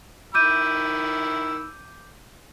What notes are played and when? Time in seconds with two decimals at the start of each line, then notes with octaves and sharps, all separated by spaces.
0.34 D#3 B5 D6 E6 G6 D#7